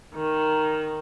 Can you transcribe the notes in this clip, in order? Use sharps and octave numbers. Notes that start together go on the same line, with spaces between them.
D#3